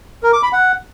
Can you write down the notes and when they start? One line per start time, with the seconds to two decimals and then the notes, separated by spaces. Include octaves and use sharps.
0.23 A#4
0.33 D6
0.43 B5
0.53 F#5